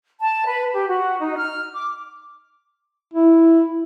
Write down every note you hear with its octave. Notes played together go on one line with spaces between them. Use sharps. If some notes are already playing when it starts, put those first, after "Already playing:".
A5
B4
G4
F#4
D#4
F6
D6
E4